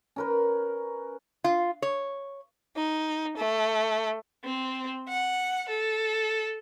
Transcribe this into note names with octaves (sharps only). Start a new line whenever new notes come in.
C#4 A#4 B4
F4
C#5
D#4
A3
C4
F#5
A4